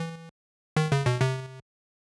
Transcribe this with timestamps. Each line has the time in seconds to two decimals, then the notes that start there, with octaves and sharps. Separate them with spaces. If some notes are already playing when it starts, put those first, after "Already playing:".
Already playing: E3
0.77 D#3
0.92 C#3
1.06 B2
1.21 C3